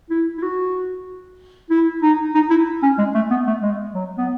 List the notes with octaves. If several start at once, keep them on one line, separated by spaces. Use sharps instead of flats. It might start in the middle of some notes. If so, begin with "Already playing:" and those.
E4
E4
F#4
E4
D#4
D#4
E4
C#4
G#3
A3
B3
A3
G#3
F#3
B3